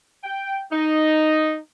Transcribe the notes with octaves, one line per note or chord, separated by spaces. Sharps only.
G5
D#4